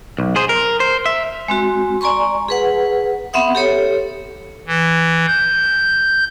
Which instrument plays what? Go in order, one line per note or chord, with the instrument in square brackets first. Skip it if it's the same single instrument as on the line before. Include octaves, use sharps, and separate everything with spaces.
[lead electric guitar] B1
G#4 C5
A#4
C5
E5
[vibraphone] G#3 C4 F#4
D5 G#5 A#5 C6 C#6
G#4 B4 F#5
B3 C4 E5 F#5 D#6
G4 A4 C#5
[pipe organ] E3
G6